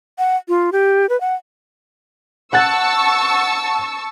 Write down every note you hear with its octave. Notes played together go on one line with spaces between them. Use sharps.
F#5
F4
G4
B4
F#5
F#5 A5 C#6 E6 F#6 A6